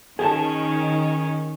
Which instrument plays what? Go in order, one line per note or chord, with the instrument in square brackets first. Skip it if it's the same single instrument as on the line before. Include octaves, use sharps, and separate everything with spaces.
[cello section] D#3 [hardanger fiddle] C#4 [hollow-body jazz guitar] G#4 A5